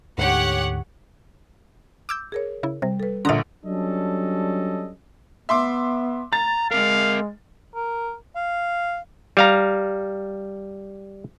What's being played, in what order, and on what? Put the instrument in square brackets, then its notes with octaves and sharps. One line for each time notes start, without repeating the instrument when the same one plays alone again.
[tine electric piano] D2 G#2 D3 [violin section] G4 C#5 F#5
[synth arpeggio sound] D6 E6 G6
[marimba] G#4 A#4 C#5
[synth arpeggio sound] C#3 E4
[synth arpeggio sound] C3 [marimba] G3
[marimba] A4 B4
[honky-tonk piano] A#1 D3 [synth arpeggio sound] F5 A#5 [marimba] C6 D#6
[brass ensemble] F#3 G3 C#4 D4 A4 D#5
[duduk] B3 [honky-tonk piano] E5 C6 D6
[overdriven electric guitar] A#5 [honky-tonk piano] A6
[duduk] G#3 [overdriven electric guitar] C4 A#4 [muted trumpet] F5
[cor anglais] A#4
F5
[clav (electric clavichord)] G3 F5 A#5